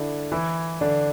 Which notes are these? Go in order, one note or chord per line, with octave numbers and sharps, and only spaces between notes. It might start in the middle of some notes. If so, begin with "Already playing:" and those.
Already playing: D3 D4 E4
E3 E4
D3 D4